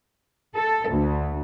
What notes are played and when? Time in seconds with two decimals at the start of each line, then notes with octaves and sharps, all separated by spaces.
0.54 A4
0.89 D2